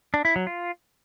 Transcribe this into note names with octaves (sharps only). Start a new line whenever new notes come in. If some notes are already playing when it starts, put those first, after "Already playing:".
D4
E4
F#3
F4